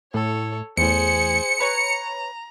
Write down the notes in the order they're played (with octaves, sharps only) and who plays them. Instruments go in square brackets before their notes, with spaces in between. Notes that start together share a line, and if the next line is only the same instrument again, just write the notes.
[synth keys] A2 [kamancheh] A4 C#5
[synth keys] E2 A2 [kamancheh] G#4 C5 [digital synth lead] C#7
[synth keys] B4 C#5 [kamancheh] A#5